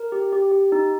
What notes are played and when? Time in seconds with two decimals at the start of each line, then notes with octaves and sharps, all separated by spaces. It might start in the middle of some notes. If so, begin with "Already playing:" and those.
Already playing: A#4
0.12 G4
0.33 G4
0.52 G4
0.72 D#4